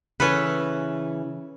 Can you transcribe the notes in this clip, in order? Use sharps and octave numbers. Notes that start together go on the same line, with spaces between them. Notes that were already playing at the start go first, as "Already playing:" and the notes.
C#3 E3 C#4 A4 B4